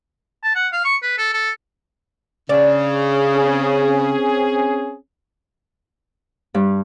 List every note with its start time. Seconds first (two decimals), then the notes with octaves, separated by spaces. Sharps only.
0.43 A5
0.56 F#5
0.73 F5
0.85 C#6
1.02 B4
1.18 A4
1.34 A4
2.49 C#3 D4 D5
3.36 C4 C#4 G#4
6.54 G2